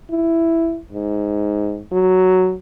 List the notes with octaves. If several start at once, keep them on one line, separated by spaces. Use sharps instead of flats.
E4
G#2
F#3